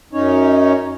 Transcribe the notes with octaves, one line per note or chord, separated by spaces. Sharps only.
F#2 C#4 D#4 C#5